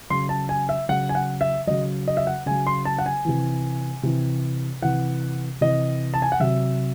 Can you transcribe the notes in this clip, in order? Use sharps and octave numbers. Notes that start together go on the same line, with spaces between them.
C#3 F#3 C6
A5
G#5
E5
C#3 F#3 F#5
G#5
F#5
E5
C#3 F#3 D#5
D#5
E5
F#5
C#3 F#3 G#5
C6
A5
F#5
G#5
C3 E3
C3 E3
C3 E3 F#5
C3 E3 D#5
A5
G#5
F#5
C3 F#3 E5